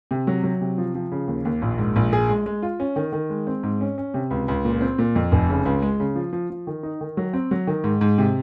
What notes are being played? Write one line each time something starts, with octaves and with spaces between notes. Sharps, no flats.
C3
F#3
F#3
C3
F3
F3
C#3
D#2
D#2
A#1
G#2
A#1
G#4
G#3
G#3
F4
C#4
D#3
D#3
G#3
C4
G#2
C#4
C#4
C3
C#2
C#2
A#2
C4
A#2
F2
F1
C#3
C#2
G#3
C#3
F3
F3
F3
D#3
D#4
D#3
F#3
C4
F#3
D#3
G#2
G#2
C3